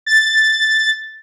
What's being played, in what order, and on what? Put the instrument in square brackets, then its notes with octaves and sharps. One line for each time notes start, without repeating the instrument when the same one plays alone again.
[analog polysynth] A6